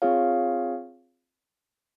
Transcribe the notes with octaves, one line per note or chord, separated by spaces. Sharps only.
C4 F4 G#4 C#5 F5